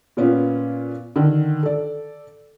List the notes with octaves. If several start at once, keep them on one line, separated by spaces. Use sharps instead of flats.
A#2 B3 C#4 F4
D3 D#3
A4 D5